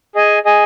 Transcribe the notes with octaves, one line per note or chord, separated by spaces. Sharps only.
G#4 D#5 G#5
G#4 D#5 G#5